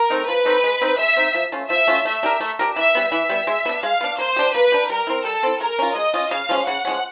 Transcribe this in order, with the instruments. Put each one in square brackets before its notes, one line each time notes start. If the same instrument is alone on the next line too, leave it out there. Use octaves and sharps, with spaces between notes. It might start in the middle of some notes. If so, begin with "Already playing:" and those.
Already playing: [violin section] A#4
[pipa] A3 C4 D#4
[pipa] F3 [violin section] B4
[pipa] A3 C4 D#4
G#3
C4 D#4
[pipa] G#3 [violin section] E5
[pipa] C4 D#4
F3
A3 C#4 F4
[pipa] F3 [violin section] E5
[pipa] A3 C#4 F4
[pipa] A3 [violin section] E5
[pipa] D4 G4 A#4
A3
D4 G4 A#4
[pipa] E3 [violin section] E5
[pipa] G3 B3
[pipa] E3 [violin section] E5
[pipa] G3 B3
G#3
B3 D4
[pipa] G#3 [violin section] F5
[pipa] B3 D4
[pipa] A#3 [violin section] C5
[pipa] D4 G4
[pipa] A#3 [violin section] B4
[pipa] D4 G4
[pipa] G3 [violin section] A#4
[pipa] C4 E4
[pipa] G3 [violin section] A4
[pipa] C4 E4
[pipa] G#3 [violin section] A#4
[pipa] C#4 F4
[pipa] G#3 [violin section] D#5
[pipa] C#4 F4
[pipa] C#3 [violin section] F5
[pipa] F3 G#3 C#4
[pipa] C#3 [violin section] F#5
[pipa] F3 G#3 C#4